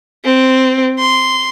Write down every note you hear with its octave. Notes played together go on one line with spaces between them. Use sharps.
C4
C6